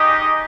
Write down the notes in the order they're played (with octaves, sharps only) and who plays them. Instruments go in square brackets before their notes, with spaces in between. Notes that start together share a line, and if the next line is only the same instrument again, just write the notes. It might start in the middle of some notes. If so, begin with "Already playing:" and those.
Already playing: [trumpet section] G#3 D#4 G4 D#5